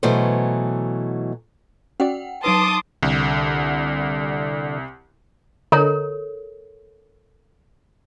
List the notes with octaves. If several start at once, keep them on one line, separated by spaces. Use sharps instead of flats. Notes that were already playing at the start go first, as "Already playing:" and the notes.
B2 E3 F#3 A3 C5
C#4 F#4 D5 F#5 G5
F#3 D#4 B4 A5 C6 D6 D#6
C2 D3
D3 A4 A#4 C#5 D#5 A#5